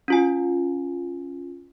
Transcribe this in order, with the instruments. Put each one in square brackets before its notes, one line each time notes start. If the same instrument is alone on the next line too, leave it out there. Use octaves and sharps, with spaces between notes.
[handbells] C#4 F4 G#5